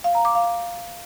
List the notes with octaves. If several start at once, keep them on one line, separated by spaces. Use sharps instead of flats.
F5
A#5
D6
F5